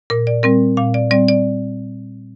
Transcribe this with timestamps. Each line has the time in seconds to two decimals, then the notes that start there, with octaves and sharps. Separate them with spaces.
0.10 A#2 A#4
0.27 D5
0.43 G3 C4 A#4
0.77 A#2 F5
0.94 D5
1.11 G3 C4 D5
1.28 D5